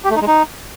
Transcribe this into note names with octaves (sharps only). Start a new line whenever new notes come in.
G4
A3
D#4
G#3
D#4